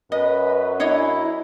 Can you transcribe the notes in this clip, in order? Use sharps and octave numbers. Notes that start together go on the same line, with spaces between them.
F#2 B4 D#5
D4 E4 C#5 D#5